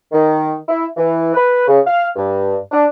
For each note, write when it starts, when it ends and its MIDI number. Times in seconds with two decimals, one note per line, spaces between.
0.12 0.54 51
0.69 0.85 64
0.96 1.32 52
1.34 1.63 71
1.67 1.78 49
1.86 2.06 77
2.16 2.57 43
2.72 2.85 62